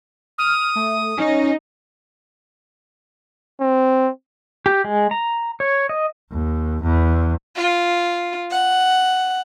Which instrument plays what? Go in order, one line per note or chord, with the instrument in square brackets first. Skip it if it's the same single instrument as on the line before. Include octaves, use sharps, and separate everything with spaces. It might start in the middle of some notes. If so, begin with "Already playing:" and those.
[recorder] D#6 [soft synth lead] F6
[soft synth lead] A3
[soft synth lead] C#4 [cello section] D#4
[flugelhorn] C4
[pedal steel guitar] G4
G#3
A#5
C#5
D#5
[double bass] D#2
E2
[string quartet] F4
F#5